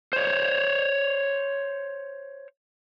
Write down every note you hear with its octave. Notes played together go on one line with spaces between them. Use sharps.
C5 C#5